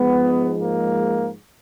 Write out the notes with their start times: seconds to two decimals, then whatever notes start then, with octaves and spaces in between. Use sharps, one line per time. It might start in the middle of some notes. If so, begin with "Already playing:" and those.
Already playing: G#2 F3 G#3 B3
0.60 A#3